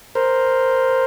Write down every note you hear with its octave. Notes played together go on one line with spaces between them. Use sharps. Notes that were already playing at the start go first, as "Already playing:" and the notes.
A#4 C5